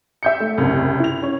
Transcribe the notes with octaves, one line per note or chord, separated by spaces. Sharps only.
E5 G6 C#7
A3
F#1 C2
E4 F7
C#4 C#5